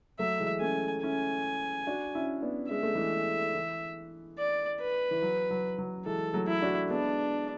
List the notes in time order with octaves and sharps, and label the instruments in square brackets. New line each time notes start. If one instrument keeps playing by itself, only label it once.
[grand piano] F#3 A3 [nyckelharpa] E5
[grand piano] E3 G#3
[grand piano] A3 C#4 [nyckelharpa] G#5
[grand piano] C#4 E4 [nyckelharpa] G#5
[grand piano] D4 F#4
C#4 E4
B3 D4
[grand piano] G#3 [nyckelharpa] E5
[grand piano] A3
E3 G#3
E3
[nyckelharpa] D5
B4
[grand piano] E3
F#3
F#3
F#3
[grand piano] E3 G#3 [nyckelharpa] A4
[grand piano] F#3 A3
[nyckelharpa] E4
[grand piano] D4 F#4
[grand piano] G#3 B3 [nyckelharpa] D4